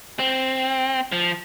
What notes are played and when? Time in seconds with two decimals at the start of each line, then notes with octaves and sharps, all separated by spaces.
0.19 C4
1.12 F3